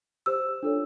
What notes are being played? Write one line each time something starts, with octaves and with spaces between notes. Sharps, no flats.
G4 C5 E6
D4 F4 A4 C#5